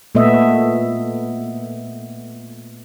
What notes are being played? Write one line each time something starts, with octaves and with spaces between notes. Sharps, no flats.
A#2 A3 B3 D#5 E5